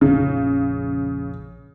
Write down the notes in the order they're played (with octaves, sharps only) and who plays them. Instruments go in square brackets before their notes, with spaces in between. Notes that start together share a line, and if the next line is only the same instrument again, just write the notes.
[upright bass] A#1 F2 [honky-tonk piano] C#3